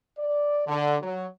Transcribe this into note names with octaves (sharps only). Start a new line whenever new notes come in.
D5
D3
F#3